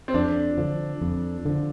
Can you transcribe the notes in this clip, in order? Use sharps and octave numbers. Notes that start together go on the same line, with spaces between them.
C4
F2 D4
D3 F3
F2
D3 F3